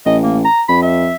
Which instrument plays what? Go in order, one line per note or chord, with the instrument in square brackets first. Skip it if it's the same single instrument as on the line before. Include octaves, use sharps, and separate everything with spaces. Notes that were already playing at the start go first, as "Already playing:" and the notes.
[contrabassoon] A1 [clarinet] D#5
[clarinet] A#3
A#5
[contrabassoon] F2 [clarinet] B5
[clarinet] E5